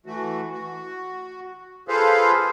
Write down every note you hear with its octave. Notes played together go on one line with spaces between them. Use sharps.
E3 A3 F#4
F#4
F4 G#4 A4 B4 C5 F5